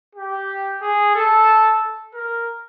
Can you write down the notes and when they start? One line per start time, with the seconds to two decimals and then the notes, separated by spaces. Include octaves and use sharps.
0.15 G4
0.81 G#4
1.15 A4
2.14 A#4